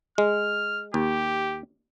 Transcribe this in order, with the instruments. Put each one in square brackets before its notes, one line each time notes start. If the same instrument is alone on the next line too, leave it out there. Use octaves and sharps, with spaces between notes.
[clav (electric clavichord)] G#3 [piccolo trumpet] F6
[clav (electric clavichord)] D#2 [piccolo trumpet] G4